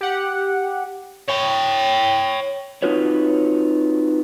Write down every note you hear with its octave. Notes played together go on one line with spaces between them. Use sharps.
G4 F#5
C#5 G5
C4 D#4 F4 F#4 B4 C#5